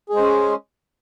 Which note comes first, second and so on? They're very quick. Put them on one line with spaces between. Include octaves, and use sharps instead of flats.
G#4 G#3 C5 C#4